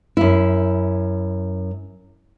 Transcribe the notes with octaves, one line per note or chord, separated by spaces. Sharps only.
F#2 E4